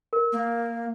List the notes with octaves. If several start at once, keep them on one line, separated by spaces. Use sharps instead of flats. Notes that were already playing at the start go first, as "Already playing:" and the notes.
A#4
A#3